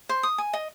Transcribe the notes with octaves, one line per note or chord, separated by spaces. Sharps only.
C5
D#6
G#5
D#5